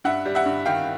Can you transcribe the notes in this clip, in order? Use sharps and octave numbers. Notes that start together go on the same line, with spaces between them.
G2 E5 F#5
G3
E5 F#5
G2
D#3 F5 G5